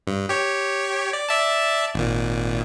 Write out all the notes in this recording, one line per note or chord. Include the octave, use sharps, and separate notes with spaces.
G2
G4 C#5
D5
D5 E5 A5
G#1 A#2